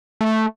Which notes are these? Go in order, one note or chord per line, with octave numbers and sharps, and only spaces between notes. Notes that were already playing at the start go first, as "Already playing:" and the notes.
A3